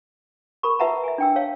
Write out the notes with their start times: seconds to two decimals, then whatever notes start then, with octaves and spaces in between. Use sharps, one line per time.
0.63 A#4 B5 C#6
0.79 F4 B4 E5 F#5 A5 A#5
1.04 E5 G#5
1.18 D4 G5 E6
1.36 C#5 F5 A5